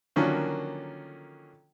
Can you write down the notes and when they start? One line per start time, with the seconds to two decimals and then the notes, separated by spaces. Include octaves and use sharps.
0.16 D3 D#3 F3 F#3 A#3 C#4